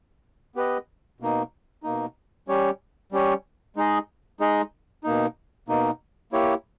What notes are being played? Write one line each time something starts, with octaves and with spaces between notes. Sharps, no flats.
B3 G4 B4 D#5
B2 A#3 D#4
B2 A#3 D#4
G3 C#4 G4 C#5
G3 C#4 G4 C#5
G#3 D#4 G#4 D#5
G#3 D#4 G#4 D#5
B2 A#3 D#4
B2 A#3 D#4
A#3 E4 G4 C#5